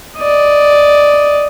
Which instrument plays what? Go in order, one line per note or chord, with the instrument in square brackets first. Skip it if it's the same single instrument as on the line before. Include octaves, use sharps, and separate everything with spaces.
[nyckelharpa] D5 D#5